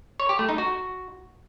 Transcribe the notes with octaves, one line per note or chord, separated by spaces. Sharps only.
C#5
G4
A3
D#4
F#4